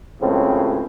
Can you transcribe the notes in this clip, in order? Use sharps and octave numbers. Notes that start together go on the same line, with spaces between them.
C#2 F#2 A2 C#3 C4